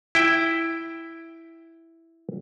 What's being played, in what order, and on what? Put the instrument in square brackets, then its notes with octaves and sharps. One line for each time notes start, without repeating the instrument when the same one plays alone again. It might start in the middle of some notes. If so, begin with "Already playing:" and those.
[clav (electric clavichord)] E4 G5